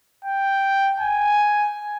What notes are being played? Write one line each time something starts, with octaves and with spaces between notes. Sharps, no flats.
G5
G#5